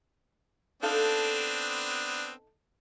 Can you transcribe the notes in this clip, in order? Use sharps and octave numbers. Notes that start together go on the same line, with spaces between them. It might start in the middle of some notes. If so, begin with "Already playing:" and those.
B3 C4 D4 D#4 A4 F5